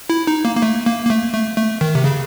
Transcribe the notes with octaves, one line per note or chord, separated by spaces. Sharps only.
E4
D#4
A#3
A#3
A3
A#3
A#3
A3
A3
A3
D#3
C3
C#3